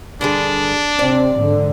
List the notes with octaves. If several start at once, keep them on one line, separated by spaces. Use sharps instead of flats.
G2 D3 D4 G#4
C3 C4 D5
G#2 D3